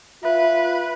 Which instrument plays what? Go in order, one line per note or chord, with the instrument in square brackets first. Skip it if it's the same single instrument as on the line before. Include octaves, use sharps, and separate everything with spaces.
[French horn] F4 [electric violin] B4 [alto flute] E5